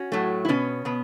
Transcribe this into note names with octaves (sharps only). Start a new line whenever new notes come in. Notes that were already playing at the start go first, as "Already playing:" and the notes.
Already playing: C#4 F#4
A2 F#3 A3
E4
B2 B3 C#4
B2 B3